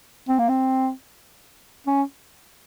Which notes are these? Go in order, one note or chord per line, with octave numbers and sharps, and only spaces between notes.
C4
A#3
C4
C#4